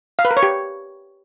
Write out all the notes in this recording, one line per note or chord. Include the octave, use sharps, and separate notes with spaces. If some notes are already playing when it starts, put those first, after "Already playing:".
F5
B4
A#4
C#5
G4